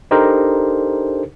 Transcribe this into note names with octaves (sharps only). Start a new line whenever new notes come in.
D4 D#4 G4 A4 A#4 C5